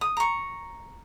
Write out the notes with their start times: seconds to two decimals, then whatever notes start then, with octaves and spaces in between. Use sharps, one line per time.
0.01 D#6
0.17 A#5 C#6